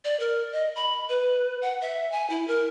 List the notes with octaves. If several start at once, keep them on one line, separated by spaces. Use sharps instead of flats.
D5
A#4
D#5
B5
B4
F#5
E5
G#5
E4
A#4